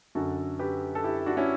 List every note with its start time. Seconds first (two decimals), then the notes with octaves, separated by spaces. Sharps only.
0.15 F#2 D3 F#4 A4
0.59 G4 B4
0.95 A4
1.04 E4 G4
1.26 D4 F#4
1.37 C#4 E4